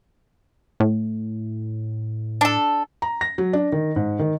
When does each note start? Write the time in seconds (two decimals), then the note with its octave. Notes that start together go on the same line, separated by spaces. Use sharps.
0.80 A2
2.41 D4 A4
3.02 A#5
3.21 A#6
3.38 F#3
3.53 D4
3.72 D#3
3.96 G#2
4.19 D#3